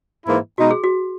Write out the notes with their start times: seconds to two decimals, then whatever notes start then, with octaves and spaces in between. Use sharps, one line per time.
0.25 G#2 E3 A#3 E4
0.58 B2 G#3 D#4 F#4
0.71 G#4
0.84 F#4